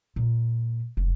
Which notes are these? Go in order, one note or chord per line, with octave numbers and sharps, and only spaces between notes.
A#2
F1 G2